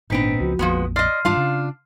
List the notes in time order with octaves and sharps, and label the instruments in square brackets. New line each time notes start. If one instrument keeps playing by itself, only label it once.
[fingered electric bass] G#1 A#2 [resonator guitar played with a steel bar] B3 C4 D#4 [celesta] D4 B6 D7
[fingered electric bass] C#2 F3 [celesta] F#4
[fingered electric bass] A#1 F2 A#2 [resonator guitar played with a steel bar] F3 G#3 B3
[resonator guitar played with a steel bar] D5 D#5 [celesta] C6 F6 C7
[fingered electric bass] G#2 E3 G3 [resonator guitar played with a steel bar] D4 F4 F5
[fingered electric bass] C#3